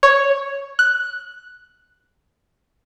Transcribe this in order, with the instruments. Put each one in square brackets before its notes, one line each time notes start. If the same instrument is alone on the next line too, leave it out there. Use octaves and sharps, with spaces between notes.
[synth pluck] C#5
F#6